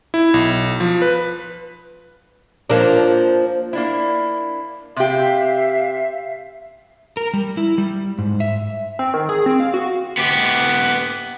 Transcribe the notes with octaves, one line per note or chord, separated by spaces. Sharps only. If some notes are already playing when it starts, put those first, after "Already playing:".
E4
B1
F3
B4
F3 A#3 D4
A#3 D4 E4
C3 G4 E5 F5
A#4
G3
E4
G3
G#2
E5
C4
D#3
G#4
C4
F5
F#4
B3 G4